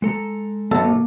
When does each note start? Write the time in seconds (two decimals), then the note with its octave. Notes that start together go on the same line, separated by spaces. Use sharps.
0.02 G#3 A4 A#5
0.71 G1 F#3 B3 A4
0.85 A#3